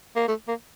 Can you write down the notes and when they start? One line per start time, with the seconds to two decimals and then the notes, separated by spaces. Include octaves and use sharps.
0.16 A#3
0.28 A3
0.48 A#3